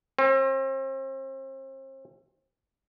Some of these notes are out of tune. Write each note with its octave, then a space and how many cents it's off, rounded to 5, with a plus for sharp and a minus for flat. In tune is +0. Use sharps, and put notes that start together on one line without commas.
C4 +40